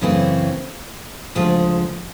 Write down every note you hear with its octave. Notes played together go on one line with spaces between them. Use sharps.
F#2 C#3 E3 A3 C4
D2 C#3 F3 G#3